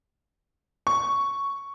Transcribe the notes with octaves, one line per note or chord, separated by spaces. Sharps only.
C#6